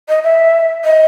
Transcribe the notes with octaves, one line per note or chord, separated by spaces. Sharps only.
D#5
E5
D#5